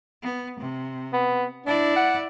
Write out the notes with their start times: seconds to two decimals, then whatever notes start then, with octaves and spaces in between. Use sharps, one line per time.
0.22 B3
0.60 C3
1.13 B3
1.66 D4 E4 D5
1.96 F#5